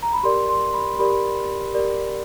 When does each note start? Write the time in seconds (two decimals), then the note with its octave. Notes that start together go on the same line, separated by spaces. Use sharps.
0.03 A#5
0.13 B5
0.23 G4 A#4 D5 C6
0.49 C6
0.74 B5
0.99 G4 A#4 D5 B5
1.74 G4 A#4 D5